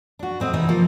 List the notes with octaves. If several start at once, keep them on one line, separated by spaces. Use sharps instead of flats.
D4 F#4
A2 C4 D#5
C3 E3 D#4 E4
F3 A#3